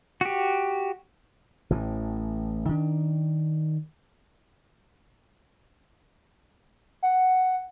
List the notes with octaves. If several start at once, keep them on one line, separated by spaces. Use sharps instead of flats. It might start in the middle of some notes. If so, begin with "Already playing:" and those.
F#4 G4
A1 A2 E3
D#3 D4
F#5